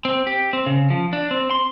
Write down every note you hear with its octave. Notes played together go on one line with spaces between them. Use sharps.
C4
G4
C4
C#3
F3
D4
C4
C6